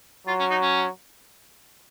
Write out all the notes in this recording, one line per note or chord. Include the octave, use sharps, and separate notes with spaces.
F#3 F4
C#4
D#4
C#4